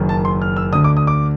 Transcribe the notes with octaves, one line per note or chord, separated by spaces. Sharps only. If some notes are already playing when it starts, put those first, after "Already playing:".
Already playing: F#1 F#2 D#3
A5
C6
F6
E6
D2 D3 D#6
D6
D#6
D6